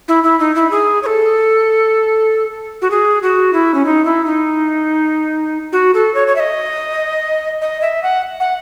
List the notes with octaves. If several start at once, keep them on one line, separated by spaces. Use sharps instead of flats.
E4
E4
D#4
E4
G#4
C#5
A4
F#4
G#4
F#4
E4
C#4
D#4
E4
D#4
F#4
A4
C#5
C#5
E5
D#5
D#5
E5
F#5
F#5